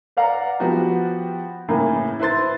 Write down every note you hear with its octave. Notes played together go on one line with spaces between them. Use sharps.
B4 D5 F5 F#5 A#5
F3 B3 F#4 G4
A2 C#3 E3 A#3
E4 B4 C5 C6 A6